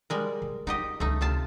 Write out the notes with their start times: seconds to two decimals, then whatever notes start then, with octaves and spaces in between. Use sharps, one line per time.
0.10 G3 G#3 A#4
0.42 D3
0.67 D#4 F4 G4 D#5
1.00 C#2 D3 A3 D#4
1.21 C3 F4 A5